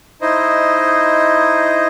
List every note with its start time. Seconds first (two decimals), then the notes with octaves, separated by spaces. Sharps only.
0.22 D#4 E4 C5 D#5